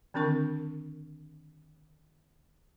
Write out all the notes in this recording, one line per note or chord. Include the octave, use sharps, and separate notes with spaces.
D3 D#3 C4 D4 A#4 C#6